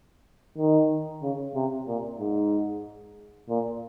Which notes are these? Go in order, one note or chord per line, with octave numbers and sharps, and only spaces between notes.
D#3
C#3
C3
A#2
G#2
A#2